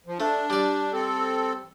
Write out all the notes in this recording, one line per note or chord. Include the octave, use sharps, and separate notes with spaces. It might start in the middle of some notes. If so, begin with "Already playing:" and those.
F3
A3 D4
G3 D5
C4 A4